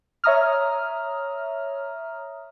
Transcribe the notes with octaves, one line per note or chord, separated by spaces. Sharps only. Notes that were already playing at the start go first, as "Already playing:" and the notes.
C#5 E5 A#5 D#6 F6